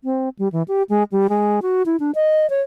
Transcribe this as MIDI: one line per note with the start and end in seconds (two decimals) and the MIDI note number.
0.04 0.29 60
0.39 0.48 55
0.52 0.63 52
0.68 0.83 67
0.89 1.03 56
1.12 1.27 55
1.29 1.60 56
1.62 1.82 66
1.86 1.96 64
2.00 2.11 62
2.15 2.49 75
2.50 2.61 73